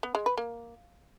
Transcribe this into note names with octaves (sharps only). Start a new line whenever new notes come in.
B3
G#3
B4
A#3